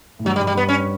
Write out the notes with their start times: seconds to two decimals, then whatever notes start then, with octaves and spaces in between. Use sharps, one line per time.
0.19 A2
0.25 G2 F#3
0.36 G3
0.40 G2
0.47 G3
0.54 G2 B3
0.69 C#4